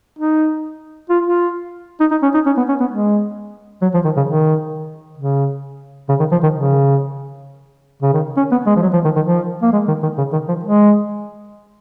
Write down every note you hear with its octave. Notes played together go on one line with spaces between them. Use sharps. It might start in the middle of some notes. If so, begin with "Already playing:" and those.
D#4
F4
F4
D#4
D#4
C#4
D#4
C#4
B3
C#4
B3
G#3
F#3
F3
D#3
C#3
D#3
C#3
C#3
D#3
F3
D#3
C#3
C#3
D#3
C#4
B3
G#3
F3
F#3
F3
D#3
D#3
F3
A#3
G#3
D#3
D#3
C#3
D#3
F3
G#3